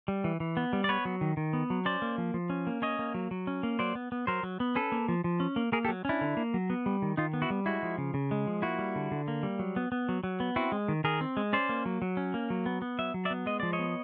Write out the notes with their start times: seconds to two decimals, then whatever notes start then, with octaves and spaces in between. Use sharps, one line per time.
0.08 G3
0.24 E3
0.40 E3
0.57 B3
0.73 G3
0.84 D5
0.89 B3 B4 C#5
1.05 F#3
1.21 D#3
1.37 D#3
1.53 B3
1.70 F#3
1.85 C#4 C5 D5
2.02 A#3
2.18 F3
2.34 F3
2.50 C#4
2.67 A#3
2.82 C#4 C#5 D#5
2.99 A#3
3.14 F#3
3.31 F#3
3.47 C#4
3.63 A#3
3.79 F#3 C5 D5
3.95 B3
4.12 B3
4.27 F#3 A#4 C5
4.43 F#3
4.60 B3
4.75 C#4 A4 B4
4.92 A#3
5.09 F3
5.24 F3
5.40 C#4
5.56 A#3
5.72 A#3 G#4 A#4
5.85 G4 A4
5.89 F#3
6.05 C#4 D4 E4
6.21 D3
6.37 A#3
6.54 F#3
6.70 B3
6.86 G3
7.02 D#3
7.17 D#3 D#4 F4
7.34 B3
7.42 E4 F#4
7.50 G3
7.66 G#3 E4 F#4
7.83 F3
7.98 C#3
8.14 C#3
8.31 G#3
8.47 F3
8.62 A#3 E4 F#4
8.79 G3
8.96 D3
9.12 D3
9.28 A#3
9.43 G3
9.59 F#3
9.76 B3
9.92 B3
10.09 F#3
10.24 F#3
10.40 B3
10.56 C4 E4 F#4
10.72 G#3
10.88 D#3
11.04 D#3 G#4 A#4
11.21 C4
11.37 G#3
11.53 C#4 C5 D5
11.69 A#3
11.85 F#3
12.02 F#3
12.17 C#4
12.34 A#3
12.50 F#3
12.66 B3
12.82 B3
12.99 F#3 E5
13.14 F#3
13.25 D5 E5
13.30 B3
13.46 G#3 D#5
13.60 F3 D5
13.73 C#5 D#5
13.79 B3